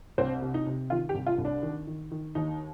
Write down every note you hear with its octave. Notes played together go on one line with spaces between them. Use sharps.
C2 C4
C3
D#4
C3
D#3 F4
G4
C2
F4
C2
D4
D#3
D#3
D#3
D#2 D#4